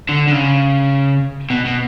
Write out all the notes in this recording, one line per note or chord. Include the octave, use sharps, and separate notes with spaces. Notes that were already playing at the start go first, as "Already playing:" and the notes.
D3
D3
C#3
B2
B2